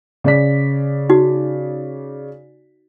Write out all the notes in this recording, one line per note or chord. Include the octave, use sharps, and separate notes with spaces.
C#3 D5 B6
D#4 F#4